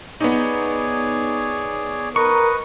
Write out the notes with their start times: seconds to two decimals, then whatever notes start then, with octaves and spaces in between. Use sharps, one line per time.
0.20 B3 D#4 G#4 C#5 D5
2.16 A#4 B4 D#5 C#6